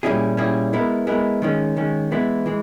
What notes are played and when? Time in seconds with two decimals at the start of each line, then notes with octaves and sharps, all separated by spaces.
0.03 A#2 G3 C#4 E4 G#4
0.37 A#2 G3 C#4 E4 G#4
0.73 G#3 B3 E4 A#4
1.07 G#3 B3 E4 A#4
1.42 D#3 G#3 C#4
1.76 D#3 G#3 C#4
2.11 E3 G#3 B3 E4
2.46 E3 G#3